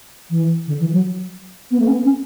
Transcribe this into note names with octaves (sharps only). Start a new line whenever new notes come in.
E3
D3
E3
F#3
B3
A3
C#4
B3
C#4